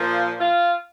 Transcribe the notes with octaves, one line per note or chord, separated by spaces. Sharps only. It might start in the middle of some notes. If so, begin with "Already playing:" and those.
Already playing: A#2 F3
F4